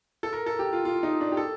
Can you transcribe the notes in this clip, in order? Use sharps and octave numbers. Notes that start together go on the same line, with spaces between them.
A4
A#4
A4
G4
F4
F4
D#4
D4
G4
A4